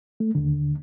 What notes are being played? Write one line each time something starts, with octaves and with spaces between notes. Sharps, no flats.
A3
D#2 D3